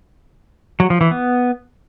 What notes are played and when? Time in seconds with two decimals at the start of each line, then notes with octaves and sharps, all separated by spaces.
0.80 F#3
0.90 F3
1.01 E3
1.11 B3